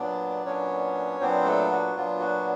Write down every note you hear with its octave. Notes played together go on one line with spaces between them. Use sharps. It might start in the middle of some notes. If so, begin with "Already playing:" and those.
Already playing: A#2 F#3 B3 D4 D5
A#2 F#3 B3 C#4 D4 C#5
A#2 F#3 B3 C4 D4 C5
A3 A4
F#4
A#2 F#3 B3 D4 F4
F#4